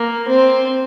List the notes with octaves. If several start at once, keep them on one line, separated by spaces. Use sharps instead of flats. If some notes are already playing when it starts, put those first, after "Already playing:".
Already playing: A#3
C4